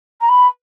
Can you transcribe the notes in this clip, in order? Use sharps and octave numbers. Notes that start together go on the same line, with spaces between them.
A#5
B5